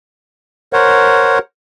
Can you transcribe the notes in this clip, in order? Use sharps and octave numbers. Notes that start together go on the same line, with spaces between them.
A#4 C5 C#5 F#5